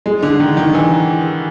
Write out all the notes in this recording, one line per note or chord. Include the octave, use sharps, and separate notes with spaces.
G#3
D3
D#3
D#3
E3